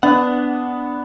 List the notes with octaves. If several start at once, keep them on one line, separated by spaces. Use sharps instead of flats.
B3 D4 F#5